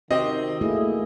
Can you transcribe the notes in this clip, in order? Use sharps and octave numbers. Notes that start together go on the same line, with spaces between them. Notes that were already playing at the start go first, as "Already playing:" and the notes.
C3 D#3 C4 F#4 D#5
A3 A#3 E4 G#4